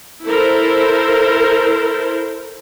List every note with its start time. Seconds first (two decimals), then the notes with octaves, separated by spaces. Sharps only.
0.25 E4 A4 A#4 C5